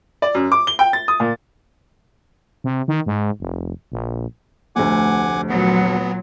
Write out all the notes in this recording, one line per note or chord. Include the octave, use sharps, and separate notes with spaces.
D5
F#2
D6
G7
G5
A6
D#6
A#2
C3
D#3
G#2
F1
A#1
F1 D2 F#5 G#5 D6
A#2 F#3 B3